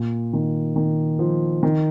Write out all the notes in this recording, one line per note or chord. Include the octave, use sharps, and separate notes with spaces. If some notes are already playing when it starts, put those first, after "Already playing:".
Already playing: A#2
D#3
D#3
F3
D#3